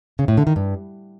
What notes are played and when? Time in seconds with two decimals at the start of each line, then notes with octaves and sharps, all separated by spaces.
0.19 C#3
0.28 A2
0.37 D3
0.47 D#3
0.56 G2